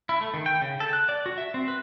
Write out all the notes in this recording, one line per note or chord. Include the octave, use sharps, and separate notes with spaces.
E4
A3
D#3
G5
C#3
A4
F#6
D5
F#4
E5
C4
B4